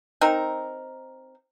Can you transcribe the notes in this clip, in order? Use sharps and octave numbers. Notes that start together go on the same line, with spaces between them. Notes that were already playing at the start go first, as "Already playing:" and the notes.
C4 D#4 A#4